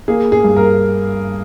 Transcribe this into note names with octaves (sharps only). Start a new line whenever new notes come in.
A#3 G#4
G#4
G2
A#4